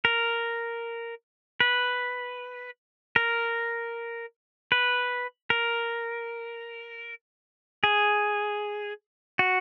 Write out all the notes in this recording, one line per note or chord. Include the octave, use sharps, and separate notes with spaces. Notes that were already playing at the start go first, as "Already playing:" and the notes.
A#4
B4
A#4
B4
A#4
G#4
F#4